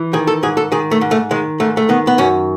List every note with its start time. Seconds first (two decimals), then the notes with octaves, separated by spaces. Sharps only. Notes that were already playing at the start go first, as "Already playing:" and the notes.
Already playing: E3
0.13 D#3 G#4
0.27 A4
0.43 G#2 G#4
0.57 A4
0.72 D#3 G#4
0.91 A3
1.01 G#2
1.11 A3
1.31 D#3 G#3
1.60 G#2 A3
1.77 A3
1.89 D#3 B3
2.07 B3
2.18 F#2 C#4